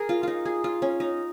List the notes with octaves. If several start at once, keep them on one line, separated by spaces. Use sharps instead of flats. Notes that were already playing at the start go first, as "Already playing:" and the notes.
Already playing: G#4 A#4
F4
D#4 F4
G#4
F4
C#4
D#4